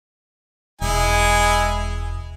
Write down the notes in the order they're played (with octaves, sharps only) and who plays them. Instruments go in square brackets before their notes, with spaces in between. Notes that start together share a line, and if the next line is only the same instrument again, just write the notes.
[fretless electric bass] E1 [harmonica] G#3 E4 G#5